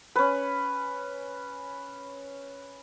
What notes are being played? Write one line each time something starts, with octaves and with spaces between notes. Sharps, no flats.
C#4 B4